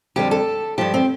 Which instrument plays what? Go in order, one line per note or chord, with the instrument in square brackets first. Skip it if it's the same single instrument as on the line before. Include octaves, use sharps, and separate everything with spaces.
[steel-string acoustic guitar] F2 D3 G3 G4
A4
G2 F3 G4
C4